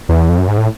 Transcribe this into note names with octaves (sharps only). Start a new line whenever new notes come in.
E2
F2
F#2
G#2
A2